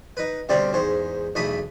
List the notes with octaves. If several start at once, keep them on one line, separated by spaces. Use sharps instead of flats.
D#4 B4
B2 D3 G3 C4 D5 F5
E2 G#2 C5 C#6
B1 E2 A3 B5 C#6 D#6